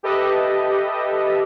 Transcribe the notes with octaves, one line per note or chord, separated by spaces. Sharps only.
G4 A4 B4 D#5 E5